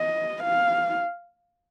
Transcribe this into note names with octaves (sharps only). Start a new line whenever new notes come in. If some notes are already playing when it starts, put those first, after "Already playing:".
Already playing: D#5
F5